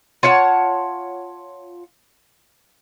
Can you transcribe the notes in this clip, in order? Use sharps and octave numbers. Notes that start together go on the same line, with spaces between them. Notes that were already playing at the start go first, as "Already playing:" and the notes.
F4 C#5 F#5 A5